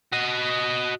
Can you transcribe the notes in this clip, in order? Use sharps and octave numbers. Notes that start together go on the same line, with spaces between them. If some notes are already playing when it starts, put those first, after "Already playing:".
F#4 D#5